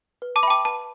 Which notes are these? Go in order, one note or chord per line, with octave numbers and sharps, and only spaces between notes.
B4
A5 D6
E5 G5 A5 B5 D6
B4 A5